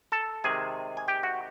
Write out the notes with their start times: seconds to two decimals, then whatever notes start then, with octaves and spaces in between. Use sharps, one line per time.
0.12 A4 A5
0.44 C3 D#3 G#3 G#4 G#5
0.97 G#5
1.08 G4 G5
1.23 F#4 F#5